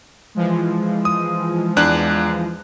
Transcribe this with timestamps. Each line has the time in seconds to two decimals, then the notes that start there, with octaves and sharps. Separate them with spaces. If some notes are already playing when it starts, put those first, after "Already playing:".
0.35 E3 F3 G#3
1.05 D#6
1.77 E2 D4 F#6